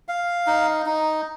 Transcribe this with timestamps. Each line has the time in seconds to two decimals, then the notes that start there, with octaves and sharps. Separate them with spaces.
0.08 F5
0.47 D#4
0.86 D#4